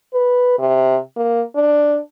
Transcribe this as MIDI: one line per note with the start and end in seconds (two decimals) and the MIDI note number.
0.14 0.54 71
0.59 0.97 48
1.16 1.42 58
1.55 1.99 62